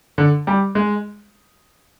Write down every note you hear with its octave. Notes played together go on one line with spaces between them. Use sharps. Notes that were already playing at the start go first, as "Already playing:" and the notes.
D3
G3
G#3